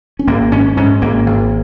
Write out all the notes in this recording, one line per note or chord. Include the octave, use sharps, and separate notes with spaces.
C#4
G#1 A#3
G#2 C#4
G#2 C#4
G#1 A#3
G#1